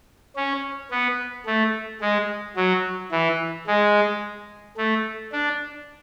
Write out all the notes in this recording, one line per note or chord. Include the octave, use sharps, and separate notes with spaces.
C#4
B3
A3
G#3
F#3
E3
G#3
A3
D4